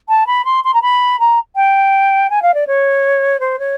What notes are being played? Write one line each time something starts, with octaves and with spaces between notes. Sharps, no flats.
A5
B5
C6
C6
A#5
B5
A#5
G5
G#5
F5
D5
C#5
C5
C#5